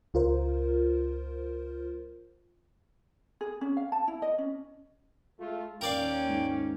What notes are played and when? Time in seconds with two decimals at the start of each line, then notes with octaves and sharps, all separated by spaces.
0.14 C#2 F4 A#4 C5
3.41 G#4
3.61 C#4
3.77 F5
3.92 A5
4.08 E4
4.22 D#5
4.38 C#4
5.40 G#3 A3 F4
5.81 D#2 A#3 C#4 A#4 D5 F5 G5
6.29 G#2